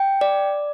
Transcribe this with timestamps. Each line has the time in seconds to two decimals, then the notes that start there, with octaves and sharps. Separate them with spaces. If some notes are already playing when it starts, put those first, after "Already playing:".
Already playing: G5
0.21 D5